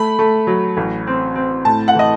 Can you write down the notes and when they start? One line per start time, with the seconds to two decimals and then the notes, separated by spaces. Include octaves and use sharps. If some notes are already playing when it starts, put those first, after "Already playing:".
Already playing: A3 B5
0.19 A3
0.47 F#3
0.77 A1
1.07 C4
1.36 C4
1.65 A2 A5
1.88 F#5
1.95 E3 D#5